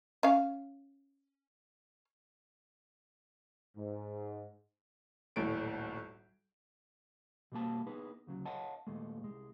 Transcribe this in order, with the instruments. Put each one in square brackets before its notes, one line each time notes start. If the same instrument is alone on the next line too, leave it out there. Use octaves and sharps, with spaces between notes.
[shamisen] C#4 F5
[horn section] G#2
[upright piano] D#1 B1 A2 D7
[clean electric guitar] B2 G3 A#3 A5
B3 D#4 G#4 B4
D2 C#3 F#3
C#5 D#5 F5 F#5 A5
D#2 A#2 G#3 A3
C2 G#3